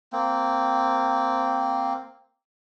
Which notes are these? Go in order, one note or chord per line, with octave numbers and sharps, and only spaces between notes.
A#3 C4